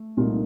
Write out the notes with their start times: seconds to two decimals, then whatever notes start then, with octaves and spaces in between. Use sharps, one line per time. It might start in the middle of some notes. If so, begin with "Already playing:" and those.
Already playing: A3
0.17 C2 A#2 A3 D#4